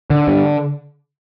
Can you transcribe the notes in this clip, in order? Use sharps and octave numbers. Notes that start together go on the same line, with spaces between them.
D3
G2